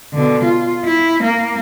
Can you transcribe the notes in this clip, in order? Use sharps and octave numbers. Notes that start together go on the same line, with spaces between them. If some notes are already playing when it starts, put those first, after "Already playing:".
B2 D3
F4
E4
A#3